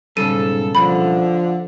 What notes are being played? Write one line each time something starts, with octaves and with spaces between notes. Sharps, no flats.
B1 G#2 C#3 G3 A4 D#7
D3 F3 B5